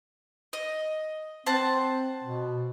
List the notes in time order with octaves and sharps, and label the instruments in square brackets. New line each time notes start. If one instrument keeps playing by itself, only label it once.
[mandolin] D#5
[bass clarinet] C4 [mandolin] C5 F#5 A5
[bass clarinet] B2